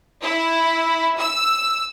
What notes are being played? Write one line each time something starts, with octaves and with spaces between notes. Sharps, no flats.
E4
E6